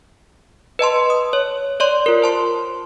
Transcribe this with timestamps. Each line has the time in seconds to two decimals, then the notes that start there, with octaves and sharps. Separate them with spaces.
0.79 B4 D#5 A5 C6
1.10 D#6
1.33 C#5
1.80 C#5 D5 C6
2.06 F4 A#4
2.22 C5 A5 C6